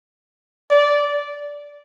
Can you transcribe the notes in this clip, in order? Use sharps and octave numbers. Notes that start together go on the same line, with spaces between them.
D5